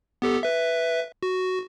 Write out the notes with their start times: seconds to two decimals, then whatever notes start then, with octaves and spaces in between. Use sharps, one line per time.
0.22 B3 G4 A4
0.43 B4 E5
1.23 F#4